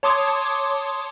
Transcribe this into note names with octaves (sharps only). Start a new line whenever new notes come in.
C#5 A5 C6 D6 D#6 G#6